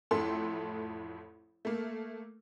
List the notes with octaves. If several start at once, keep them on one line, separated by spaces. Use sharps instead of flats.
A1 F2 A2 A3 A4 C6
A3 A#3